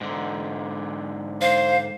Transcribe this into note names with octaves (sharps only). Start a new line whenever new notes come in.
G#2 D3
C5 F5